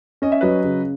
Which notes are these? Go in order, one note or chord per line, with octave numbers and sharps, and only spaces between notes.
C#4 D#5
E5
F#3 B4 D#5
C#3